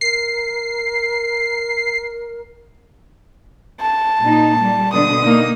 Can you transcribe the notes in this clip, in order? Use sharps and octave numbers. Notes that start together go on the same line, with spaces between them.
A#4 C7
A5
A#2 D#4
G3
B2 D3 D#6
A#3 D#4